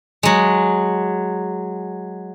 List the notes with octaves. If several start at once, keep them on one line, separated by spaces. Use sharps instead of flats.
F#3 G#3